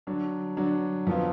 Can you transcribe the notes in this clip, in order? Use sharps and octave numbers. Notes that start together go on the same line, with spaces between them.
D3 F#3 D4
D3 F#3 D4
F2 F3 B3 F4